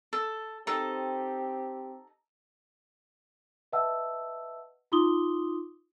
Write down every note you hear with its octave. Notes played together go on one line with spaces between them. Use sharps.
A4
C4 D#4 G4 A4
B4 D#5 E5 F#5 A5 E6
D#4 F4 C6 D6 D#6 G7